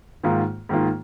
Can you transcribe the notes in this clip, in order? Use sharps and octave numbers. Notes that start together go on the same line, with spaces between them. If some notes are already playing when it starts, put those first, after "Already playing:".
G#2 D#3 A#3 F4
G#2 D#3 A#3 F4